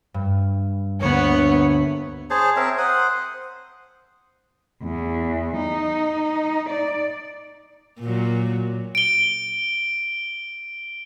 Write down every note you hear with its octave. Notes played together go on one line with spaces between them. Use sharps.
G2
D2 A#3 B3 C#5
G#4 C5 C#5 A5
C4 A#4 C#5 E5
C5 F#5 D#6
E2
D#4
D5
A#2 F#3
D7 G7